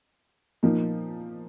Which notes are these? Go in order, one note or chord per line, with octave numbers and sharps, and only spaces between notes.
A#2 F3 A#3 D#4